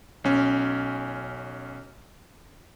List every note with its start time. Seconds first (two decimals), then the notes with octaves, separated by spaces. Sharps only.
0.24 B1 C#4